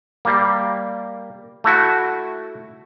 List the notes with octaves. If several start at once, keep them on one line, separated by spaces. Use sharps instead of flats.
G3 A#3
A3 E4 F#4